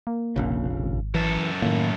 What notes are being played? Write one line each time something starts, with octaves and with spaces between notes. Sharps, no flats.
A#3
F1 A#1 C#3
G#1
F#2 E3 A4
A2 D#3 A#3